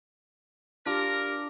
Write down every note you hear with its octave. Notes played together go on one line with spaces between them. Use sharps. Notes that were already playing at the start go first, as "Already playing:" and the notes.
D4 F4 G4 A#4 D6